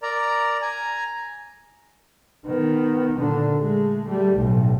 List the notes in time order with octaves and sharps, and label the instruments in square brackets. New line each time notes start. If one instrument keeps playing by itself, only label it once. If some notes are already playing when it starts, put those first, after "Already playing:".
[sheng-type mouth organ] A#4 D5 A#5
G#5 A#5
[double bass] D#3 B3
A#2 D3
G#3 A3
G3 A3
B1 A2